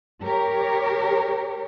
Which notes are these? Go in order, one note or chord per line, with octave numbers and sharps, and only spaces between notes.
G4 A#4 C#5